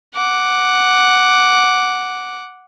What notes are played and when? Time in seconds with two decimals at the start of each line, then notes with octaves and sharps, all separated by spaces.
0.15 F#5 D6